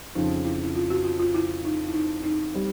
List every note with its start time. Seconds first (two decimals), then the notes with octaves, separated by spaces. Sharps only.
0.15 F2 C#3 F3 D#4
0.45 E4
0.63 E4
0.75 F4
0.90 F#4
1.04 F4
1.19 F4
1.34 E4
1.65 D#4
1.88 E4
1.94 D#4
2.23 D#4
2.53 G3 C4